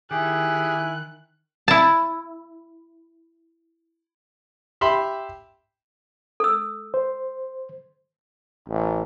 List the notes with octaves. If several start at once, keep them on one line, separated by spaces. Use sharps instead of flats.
D#3 E4 G4 G#4 G#5 F#6
E4 A5
G4 E5 B5 C6
A4 E6
C5
A1